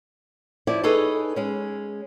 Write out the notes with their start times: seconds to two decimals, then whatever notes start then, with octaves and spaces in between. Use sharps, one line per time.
0.67 F3 E4 C#5 D5
0.83 D#4 G#4 A4 B4 C#5
1.36 G#3 C#4